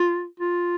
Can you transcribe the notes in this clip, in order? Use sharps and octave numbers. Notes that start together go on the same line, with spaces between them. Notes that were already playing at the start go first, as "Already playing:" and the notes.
Already playing: F4
F4